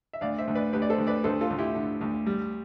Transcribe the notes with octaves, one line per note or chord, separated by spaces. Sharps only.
E5
D2 D5 F5
C5 E5
D2
B4 D5
D2 G4 B4
D5
A4 C5
D2
B4 D5
D2 A4 C5
F4 A4
D2
E4 G4
D3
D2
G3